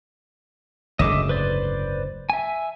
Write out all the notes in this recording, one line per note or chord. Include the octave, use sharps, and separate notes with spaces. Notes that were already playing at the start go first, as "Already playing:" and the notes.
F#1 D2 G#2 D#5 E5 D6
B4 C5 D5
E5 G#5